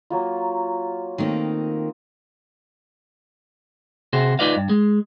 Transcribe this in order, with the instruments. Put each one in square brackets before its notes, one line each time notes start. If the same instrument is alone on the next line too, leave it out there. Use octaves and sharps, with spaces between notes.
[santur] F#3 A#3 F4
[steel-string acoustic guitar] D#3 A3 A#3 [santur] C4 D#6
[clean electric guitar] C3 F#4 G#4 C5
D#4 F4 B4 D5 D#5 F5
G2
G#3